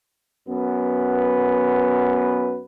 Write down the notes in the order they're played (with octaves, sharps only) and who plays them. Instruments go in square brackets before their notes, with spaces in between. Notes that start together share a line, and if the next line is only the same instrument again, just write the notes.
[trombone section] F#2 B3 B4